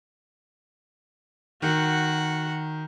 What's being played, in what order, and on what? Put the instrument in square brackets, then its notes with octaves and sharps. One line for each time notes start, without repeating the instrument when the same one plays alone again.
[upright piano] D#3 [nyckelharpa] F#4 F#5